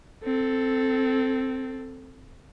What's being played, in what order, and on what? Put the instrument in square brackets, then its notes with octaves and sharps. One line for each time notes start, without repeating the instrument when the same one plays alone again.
[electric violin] C4 A4